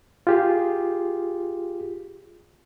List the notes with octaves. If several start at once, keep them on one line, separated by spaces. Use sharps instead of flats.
F4 G4 G#4